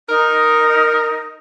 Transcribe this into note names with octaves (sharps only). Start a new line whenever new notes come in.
D#4 A#4